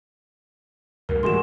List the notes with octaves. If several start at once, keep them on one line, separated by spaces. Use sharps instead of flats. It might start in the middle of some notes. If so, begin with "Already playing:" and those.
D2 G2 D3 A#4
A2 E3 G3 G#3 F#4 G#4 C6 E7